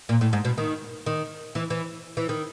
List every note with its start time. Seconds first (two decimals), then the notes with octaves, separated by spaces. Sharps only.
0.09 A#2
0.21 A2
0.33 G#2
0.45 B2
0.58 D#3
1.06 D#3
1.55 E3
1.70 E3
2.17 E3
2.29 D#3